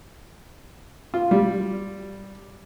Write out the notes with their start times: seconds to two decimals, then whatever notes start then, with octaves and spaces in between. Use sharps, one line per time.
1.14 F4
1.31 G3